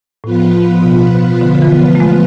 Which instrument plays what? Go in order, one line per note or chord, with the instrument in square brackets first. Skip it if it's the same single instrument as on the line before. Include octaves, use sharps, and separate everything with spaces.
[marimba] A2 [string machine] F3 B3 F4 B4
[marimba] B2
D3
D3
E3
A3
G#3